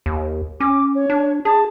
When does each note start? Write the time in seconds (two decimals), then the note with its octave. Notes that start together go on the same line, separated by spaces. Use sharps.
0.06 D#2
0.60 C#4 D6
0.95 C#5
1.10 D4
1.45 G#4 A5